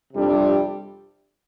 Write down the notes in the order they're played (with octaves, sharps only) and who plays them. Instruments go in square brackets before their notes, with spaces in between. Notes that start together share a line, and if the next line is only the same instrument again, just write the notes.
[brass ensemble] F2 C3 G3 D4